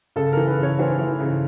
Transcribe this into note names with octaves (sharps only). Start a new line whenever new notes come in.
C#3 A4
E3 A#4
B4
C#3 C#5
E3 C5
E3
C#3